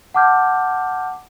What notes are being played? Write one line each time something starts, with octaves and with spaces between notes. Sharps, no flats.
F#5 A5 D6 F6 G6